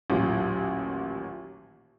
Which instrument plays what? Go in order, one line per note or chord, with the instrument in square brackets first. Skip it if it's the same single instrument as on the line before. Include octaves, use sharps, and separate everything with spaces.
[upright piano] A1 D#2 A#2 F#3